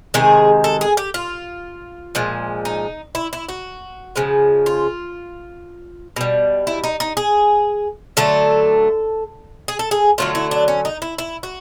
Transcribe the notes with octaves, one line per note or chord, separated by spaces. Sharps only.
C3 D#3 G#3 G#4
A4
G#4
G4
F4
A#2 F3 G#3
D#4
E4
E4
F#4
C#3 F3 G#3
F4
B2 G3
E4
D#4
D#4
G#4
D3 F#3 A3 A4
G#4
A4
G#4
D3 F#3 A3 F4
E4
D4
C#4
D#4
E4
E4
F#4